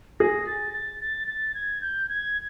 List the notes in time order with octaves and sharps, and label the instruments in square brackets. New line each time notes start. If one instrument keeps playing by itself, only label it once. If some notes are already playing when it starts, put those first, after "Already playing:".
[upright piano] G#4 [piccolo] A#6
[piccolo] A6
A6
A6
A6
G#6
G6
G#6